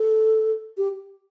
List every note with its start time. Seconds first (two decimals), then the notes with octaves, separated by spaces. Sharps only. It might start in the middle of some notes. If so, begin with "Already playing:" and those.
Already playing: A4
0.78 G4